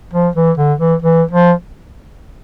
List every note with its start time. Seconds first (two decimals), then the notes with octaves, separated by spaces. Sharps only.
0.13 F3
0.36 E3
0.58 D3
0.79 E3
1.02 E3
1.31 F3